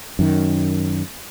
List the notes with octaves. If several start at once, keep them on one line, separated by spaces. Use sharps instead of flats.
F#2 D#3